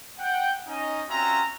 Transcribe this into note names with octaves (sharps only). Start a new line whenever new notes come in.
F#5 G5
C#4 D#4 D#5
C4 C#4 F4 F#4 E5 A#5